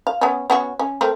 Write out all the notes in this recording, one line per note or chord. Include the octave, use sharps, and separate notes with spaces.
F5
B3 C#4
B3 C#4 F#4
C#4
A3 C4 A#4